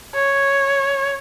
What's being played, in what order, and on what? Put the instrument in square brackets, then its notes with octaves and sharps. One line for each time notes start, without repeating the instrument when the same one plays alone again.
[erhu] C#5